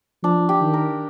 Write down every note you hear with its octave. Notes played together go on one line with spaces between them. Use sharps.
F3 D4
G4
D#3
A#4